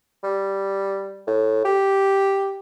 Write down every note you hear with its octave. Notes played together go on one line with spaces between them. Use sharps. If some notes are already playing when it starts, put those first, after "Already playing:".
G3
A2
G4